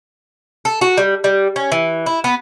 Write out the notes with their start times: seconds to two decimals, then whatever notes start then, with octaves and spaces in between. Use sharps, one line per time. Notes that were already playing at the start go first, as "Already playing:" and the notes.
0.65 A4
0.81 F#4
0.97 G3
1.24 G3
1.56 C#4
1.72 E3
2.06 E4
2.24 B3